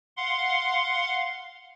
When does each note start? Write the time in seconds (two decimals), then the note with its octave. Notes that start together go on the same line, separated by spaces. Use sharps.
0.17 F5 F#5 C6